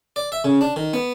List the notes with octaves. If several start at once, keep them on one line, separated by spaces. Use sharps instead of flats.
D5
E5
C#3
D4
D#3
B3